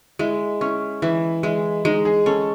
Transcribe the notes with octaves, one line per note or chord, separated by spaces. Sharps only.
G#3 E4
C#4 E4
E3 E4
G#3 E4
G#3 D#4
G#4
C#4 A4